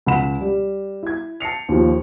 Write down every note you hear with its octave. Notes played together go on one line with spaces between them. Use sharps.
C#2 F#5 B5 E7
G3
E4 G#6
A5 C7 C#7 F7
D#2 F3